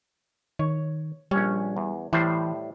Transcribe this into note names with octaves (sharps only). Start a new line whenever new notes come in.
D#3 C#5
A#1 G3 C#4 C#5
E2
A2 E3 G3 C5